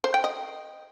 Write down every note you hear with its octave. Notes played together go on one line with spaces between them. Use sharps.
C5
G5
D#5